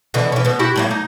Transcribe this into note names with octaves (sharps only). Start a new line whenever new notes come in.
B2 D3 E3
E3 C#4
B2 B3
E4 F#4 G4
A2 F#3 A#3
D#4